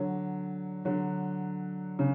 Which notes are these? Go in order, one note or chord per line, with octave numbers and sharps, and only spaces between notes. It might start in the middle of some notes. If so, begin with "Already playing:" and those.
Already playing: D3 F#3
D3 F#3
C#3